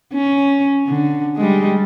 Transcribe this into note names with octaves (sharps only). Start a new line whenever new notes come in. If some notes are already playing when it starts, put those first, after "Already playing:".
C#4
D3
G3 G#3